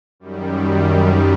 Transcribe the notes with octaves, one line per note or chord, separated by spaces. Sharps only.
F#2 D#3 G3